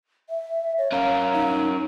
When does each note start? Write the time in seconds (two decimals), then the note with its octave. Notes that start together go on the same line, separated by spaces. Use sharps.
0.30 E5
0.78 C#5
0.92 C#4 A#4 F5
1.33 D#4